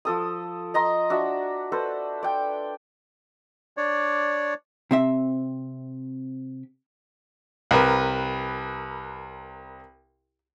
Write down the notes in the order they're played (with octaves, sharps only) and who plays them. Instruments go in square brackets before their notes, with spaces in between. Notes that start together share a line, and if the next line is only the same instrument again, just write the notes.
[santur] F3 A4 D#6
D#5 A#5 C6
D4 F#4 E5
A4 B4 C5
D5 G5
[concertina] D4 C#5 D5
[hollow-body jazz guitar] C3 C4 E5
[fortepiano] C2 A#4 B4